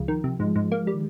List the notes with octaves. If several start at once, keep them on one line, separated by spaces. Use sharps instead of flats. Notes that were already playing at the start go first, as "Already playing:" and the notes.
Already playing: C#2 F3
D#3
C3
G#2 F3 G#3
G#2
A#3
G3
D#3